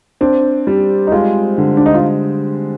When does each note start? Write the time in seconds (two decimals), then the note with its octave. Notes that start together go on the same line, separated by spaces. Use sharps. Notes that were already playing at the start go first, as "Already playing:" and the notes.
0.21 C4 D4
0.67 G3
1.07 D#4
1.12 G#3 F4
1.58 D3
1.77 D4
1.86 D#4
1.94 F4